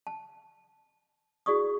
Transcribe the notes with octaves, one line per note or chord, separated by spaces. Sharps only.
A5
E4 F#4 G#4 D5 C#6 D#6